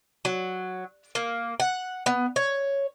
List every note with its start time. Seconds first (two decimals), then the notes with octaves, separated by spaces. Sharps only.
0.25 F#3
1.15 A#3
1.60 F#5
2.06 B3
2.36 C#5